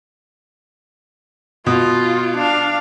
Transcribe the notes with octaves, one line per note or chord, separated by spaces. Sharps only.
B2 F4
D4 F5